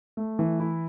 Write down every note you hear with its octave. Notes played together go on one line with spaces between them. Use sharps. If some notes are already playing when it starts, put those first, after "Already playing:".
A3
E3
E4